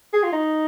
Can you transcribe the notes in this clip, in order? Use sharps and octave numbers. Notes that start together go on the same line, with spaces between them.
G#4
F4
D#4